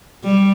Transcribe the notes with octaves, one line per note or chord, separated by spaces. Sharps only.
G3